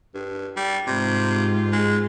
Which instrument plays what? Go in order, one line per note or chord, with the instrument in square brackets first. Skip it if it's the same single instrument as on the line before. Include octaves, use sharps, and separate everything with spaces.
[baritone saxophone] G2
G3
[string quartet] G#2 F4 [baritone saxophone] C3
[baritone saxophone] G#3